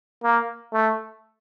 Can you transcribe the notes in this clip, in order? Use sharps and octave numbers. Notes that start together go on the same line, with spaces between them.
A#3
A3